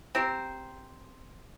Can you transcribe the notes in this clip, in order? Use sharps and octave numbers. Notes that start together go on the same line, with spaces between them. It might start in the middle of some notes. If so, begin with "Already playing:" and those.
C4 G4 A#4 C5